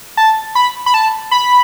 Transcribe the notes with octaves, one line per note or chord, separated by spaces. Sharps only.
A5
B5
B5
A5
B5